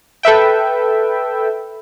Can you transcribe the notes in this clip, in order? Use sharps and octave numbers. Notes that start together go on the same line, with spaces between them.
A4 B4 E5 G5